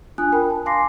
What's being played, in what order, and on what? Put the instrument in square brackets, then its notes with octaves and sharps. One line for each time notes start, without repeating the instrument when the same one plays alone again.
[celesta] D4 F4 G#5 D#6 F#6
A#4 G5 B5
A5
F5 G#5 C6 D6 A#6 C7